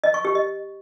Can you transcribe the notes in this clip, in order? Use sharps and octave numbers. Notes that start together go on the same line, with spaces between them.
D#5
C#6
G4
D#5